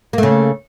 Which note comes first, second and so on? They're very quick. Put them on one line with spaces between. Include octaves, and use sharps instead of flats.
A#3 A3 C#3